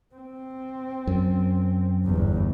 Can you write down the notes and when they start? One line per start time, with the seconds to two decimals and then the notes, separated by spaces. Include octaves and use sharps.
0.15 C4
1.07 F#2
2.05 G1 E2